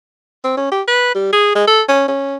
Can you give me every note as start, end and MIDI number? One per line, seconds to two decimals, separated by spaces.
0.44 0.54 60
0.57 0.67 61
0.71 0.82 67
0.88 1.13 71
1.15 1.30 55
1.33 1.53 68
1.55 1.65 56
1.67 1.82 69
1.89 2.06 61
2.08 2.36 61